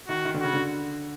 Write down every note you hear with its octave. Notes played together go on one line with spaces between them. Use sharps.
D#3 F#4
D#3
D3
C#3 F#4
D3